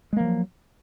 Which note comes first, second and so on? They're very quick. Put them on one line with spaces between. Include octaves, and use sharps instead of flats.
G#3 A#3 F3 F#3